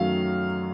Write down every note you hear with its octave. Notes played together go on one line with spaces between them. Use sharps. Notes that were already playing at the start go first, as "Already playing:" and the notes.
Already playing: F#2 D#3 F#3 A3 F5